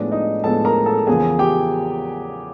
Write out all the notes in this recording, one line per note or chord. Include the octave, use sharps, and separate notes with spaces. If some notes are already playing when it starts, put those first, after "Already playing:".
Already playing: A2 F3 G#3 B3 D4 D5
D#4 D#5
A2 F3 G#3 B3 A4 A5
A#4 A#5
A4 A5
E2 C#3 F3 A#3 G#4 G#5
G4 G5